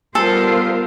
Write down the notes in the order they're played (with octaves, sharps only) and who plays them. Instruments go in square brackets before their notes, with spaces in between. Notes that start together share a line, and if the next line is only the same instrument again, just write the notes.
[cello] G3 C5 [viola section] B3 F4 A#4 [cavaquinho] A4